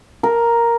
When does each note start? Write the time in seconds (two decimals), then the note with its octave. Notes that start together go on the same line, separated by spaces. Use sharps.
0.23 A#4